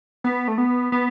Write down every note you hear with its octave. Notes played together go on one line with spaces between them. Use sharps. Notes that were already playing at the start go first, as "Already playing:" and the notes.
B3
A3
B3
B3